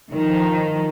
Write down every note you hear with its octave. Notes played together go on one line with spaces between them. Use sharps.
D#3 F3